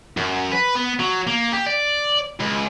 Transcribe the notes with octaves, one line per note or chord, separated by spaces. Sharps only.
F#2
B4
B3
F#3
A#3
G4
D5
C#2